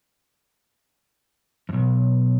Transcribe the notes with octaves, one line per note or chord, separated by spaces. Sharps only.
B1 F2